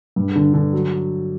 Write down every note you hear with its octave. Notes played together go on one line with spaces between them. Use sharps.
G2
D3
D3
F#3